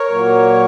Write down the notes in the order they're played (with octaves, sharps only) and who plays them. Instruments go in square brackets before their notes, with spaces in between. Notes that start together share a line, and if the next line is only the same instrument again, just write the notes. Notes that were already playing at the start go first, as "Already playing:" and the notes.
Already playing: [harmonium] A#4 C#5
A#2 F#3 A#3